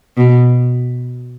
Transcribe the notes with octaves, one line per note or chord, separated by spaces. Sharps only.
B2